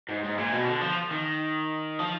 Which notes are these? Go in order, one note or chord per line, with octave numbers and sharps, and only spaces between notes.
G#2
G#2
A#2
B2
D3
F3
D#3
F3